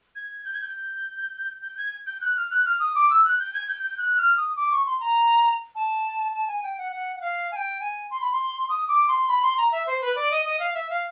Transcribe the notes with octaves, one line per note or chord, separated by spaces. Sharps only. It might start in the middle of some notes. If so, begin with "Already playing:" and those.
G#6
G6
G#6
G6
G6
G#6
G6
F#6
F6
F#6
F6
D#6
D6
E6
F#6
G6
G#6
G6
G6
F#6
F6
D#6
D6
C#6
C6
A#5
A5
A5
G#5
G5
F#5
F#5
F#5
F5
G#5
G5
G#5
C6
B5
C6
D#6
D6
C6
B5
C6
A#5
E5
C5
B4
D5
D#5
D#5
F5
E5
F5